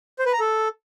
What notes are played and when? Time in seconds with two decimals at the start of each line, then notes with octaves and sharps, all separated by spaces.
0.19 C5
0.26 B4
0.33 A#5
0.40 A4